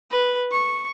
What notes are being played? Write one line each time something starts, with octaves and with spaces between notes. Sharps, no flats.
B4
C#6